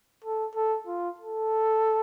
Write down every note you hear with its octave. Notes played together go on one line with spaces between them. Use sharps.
A4
A4
F4
A4